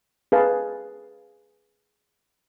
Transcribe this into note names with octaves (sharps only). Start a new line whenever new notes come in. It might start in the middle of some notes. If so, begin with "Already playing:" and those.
G#4 B4 F5 A5